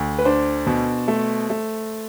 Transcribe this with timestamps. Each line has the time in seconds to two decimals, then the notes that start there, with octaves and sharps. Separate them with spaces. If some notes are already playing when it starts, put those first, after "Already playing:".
Already playing: D2
0.18 B4
0.25 D4 C5
0.67 B2
1.08 A3
1.50 A3